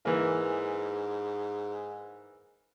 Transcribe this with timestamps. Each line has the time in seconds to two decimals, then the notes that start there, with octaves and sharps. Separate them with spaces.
0.05 G#2 E3 A#3